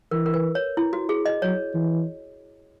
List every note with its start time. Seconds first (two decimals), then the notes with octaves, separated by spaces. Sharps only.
0.11 E3 A#4
0.26 A#4
0.34 B4
0.55 C#5
0.77 E4
0.93 F#4
1.09 G#4
1.26 D#5
1.42 F#3 C#5
1.74 E3